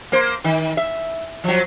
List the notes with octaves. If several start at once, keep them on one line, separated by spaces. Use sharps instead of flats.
A#3 C5
D#3
E5
F3 F#3